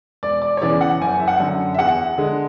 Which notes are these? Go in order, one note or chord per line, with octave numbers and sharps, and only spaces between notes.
E1 D5
D5
C#5
E2 C#3 E3 D5
F#5
F#1 G#5
E5
F#5
F#2 D3
E5
E2 F#5
D3 G#3